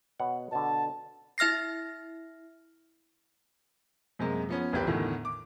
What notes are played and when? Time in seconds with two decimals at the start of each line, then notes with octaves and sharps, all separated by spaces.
0.20 B2 C#5 F#5
0.52 B2 D3 A5
1.38 E4 E5 F6 A#6 C7
4.19 F#2 C3 G#3 A#3
4.49 F3 B3 C#4
4.72 D#1 A1 A#2 C4 G4 B4
4.87 E2 A2 D3 D#3
5.25 D6